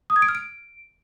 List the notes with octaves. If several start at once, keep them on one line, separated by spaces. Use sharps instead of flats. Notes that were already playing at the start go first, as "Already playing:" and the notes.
D#6
G#6
D7
F6
D7